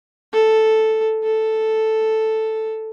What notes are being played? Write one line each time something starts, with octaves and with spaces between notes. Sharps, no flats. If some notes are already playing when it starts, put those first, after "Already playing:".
A4
A4